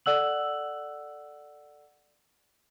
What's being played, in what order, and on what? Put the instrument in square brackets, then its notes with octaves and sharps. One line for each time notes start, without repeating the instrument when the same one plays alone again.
[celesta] A4 D5 F#5 E6 F#6 F#7